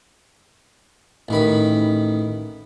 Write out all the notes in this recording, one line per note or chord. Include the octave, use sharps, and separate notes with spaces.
A1 D#3 B5